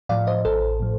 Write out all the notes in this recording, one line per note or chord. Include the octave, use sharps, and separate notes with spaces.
A2 F3 D5 F5
C5 D#5
A1 A4 C5
A2 F3